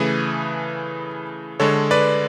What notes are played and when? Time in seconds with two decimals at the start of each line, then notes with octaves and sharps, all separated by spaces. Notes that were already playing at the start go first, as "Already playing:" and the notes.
Already playing: C#3 E3 A3 G#4 B4
1.60 D3 G#3 A4 C#5
1.91 B4 D5